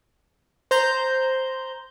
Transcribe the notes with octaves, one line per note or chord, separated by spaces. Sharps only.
C5 A#5 G6